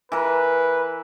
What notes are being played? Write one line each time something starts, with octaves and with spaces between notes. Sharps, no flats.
E3 A#4 B4